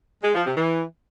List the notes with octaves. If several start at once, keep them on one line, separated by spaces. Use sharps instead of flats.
G#3
F3
C3
E3